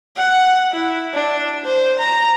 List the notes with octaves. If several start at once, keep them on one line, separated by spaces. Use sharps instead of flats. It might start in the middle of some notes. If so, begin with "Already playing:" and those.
F#5
E4
D4
C5
A#5